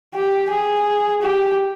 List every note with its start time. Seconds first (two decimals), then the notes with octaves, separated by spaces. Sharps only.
0.14 G4
0.50 G#4
1.22 G4